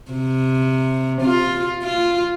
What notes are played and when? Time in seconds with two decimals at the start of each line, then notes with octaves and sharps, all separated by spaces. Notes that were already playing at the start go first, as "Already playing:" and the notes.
0.12 C3
1.22 F4
1.82 F4